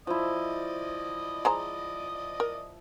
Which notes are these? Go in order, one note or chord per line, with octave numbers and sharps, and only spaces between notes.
F3 E4 D5 D#5 D#6
G#3 C5 A#5
A#4